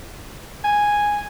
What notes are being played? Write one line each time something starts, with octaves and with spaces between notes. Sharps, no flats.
G#5